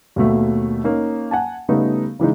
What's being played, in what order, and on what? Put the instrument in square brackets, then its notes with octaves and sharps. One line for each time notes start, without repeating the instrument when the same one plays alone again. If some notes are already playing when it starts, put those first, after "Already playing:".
[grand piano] D#2 B2 A3
A#3 C#4 D#4
F#5 G#5 A5
C#3 G3 A3 B3 D#4
C#3 E3 G#3 D#4